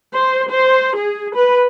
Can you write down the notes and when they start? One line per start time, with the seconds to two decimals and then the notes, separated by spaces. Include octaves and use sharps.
0.14 C5
0.50 C5
0.96 G#4
1.35 B4